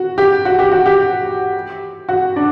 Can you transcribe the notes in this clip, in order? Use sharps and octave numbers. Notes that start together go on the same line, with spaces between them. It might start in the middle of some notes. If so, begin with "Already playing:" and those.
Already playing: F#4
G4
F#4
G4
F#4
G4
F#4
D4